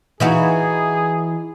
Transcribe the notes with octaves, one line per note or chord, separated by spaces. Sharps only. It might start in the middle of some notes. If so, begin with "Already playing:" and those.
E3 D#4 F#4 G#4